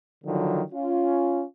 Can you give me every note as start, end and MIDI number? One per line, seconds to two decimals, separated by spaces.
0.24 0.62 50
0.24 0.62 51
0.24 0.62 53
0.24 0.62 54
0.72 1.43 61
0.72 1.43 65